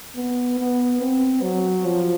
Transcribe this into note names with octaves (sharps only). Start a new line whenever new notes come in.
B3
B3
C4
F#3
F3